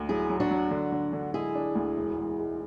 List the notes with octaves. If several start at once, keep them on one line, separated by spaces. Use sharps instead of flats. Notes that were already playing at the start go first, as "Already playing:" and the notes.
Already playing: D2 A3
F#3 E4 G#4
F#3
D4 F#4
F#3
D3
D3
D3
G#3 E4 G#4
D4
D2
E1
E1
G#3